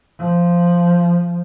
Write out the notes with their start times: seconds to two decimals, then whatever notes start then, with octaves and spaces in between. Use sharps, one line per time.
0.19 F3